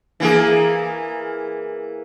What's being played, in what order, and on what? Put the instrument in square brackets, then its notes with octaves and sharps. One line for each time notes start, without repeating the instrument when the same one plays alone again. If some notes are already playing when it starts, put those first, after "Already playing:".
[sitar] E3 A#3 G#4